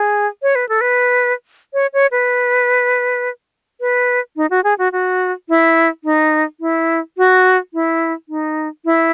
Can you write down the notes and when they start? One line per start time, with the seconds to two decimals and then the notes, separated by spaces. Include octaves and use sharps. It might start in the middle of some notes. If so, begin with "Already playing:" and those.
Already playing: G#4
0.43 C#5
0.55 B4
0.69 A4
0.81 B4
1.74 C#5
1.93 C#5
2.12 B4
3.81 B4
4.36 D#4
4.51 F#4
4.64 G#4
4.79 F#4
4.92 F#4
5.49 E4
6.04 D#4
6.60 E4
7.18 F#4
7.74 E4
8.29 D#4
8.85 E4